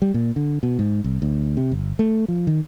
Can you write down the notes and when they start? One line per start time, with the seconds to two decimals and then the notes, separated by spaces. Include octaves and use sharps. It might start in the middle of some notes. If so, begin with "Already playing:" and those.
0.02 G3
0.14 A#2
0.36 D3
0.63 B2
0.79 G#2
1.04 C2
1.22 D2
1.57 C3
1.72 G1
1.99 A3
2.28 F3
2.47 D#3